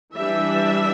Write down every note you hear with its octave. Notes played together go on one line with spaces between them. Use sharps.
E3 G3 D4 E5